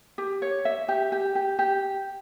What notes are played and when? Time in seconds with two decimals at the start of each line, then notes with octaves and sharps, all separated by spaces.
0.18 G4
0.42 C#5
0.65 E5
0.89 G4
1.12 G4
1.35 G4
1.59 G4